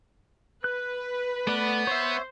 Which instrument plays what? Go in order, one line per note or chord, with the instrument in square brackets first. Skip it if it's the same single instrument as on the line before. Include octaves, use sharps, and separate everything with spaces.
[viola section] B4 [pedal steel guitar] F#6
[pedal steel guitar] A3 D5 [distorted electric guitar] B3
[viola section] C5 [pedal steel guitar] C#5 E5